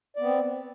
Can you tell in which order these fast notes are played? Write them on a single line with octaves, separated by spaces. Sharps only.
D5 B3 C4